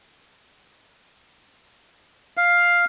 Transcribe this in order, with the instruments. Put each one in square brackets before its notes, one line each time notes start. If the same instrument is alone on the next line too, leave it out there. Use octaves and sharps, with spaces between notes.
[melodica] F5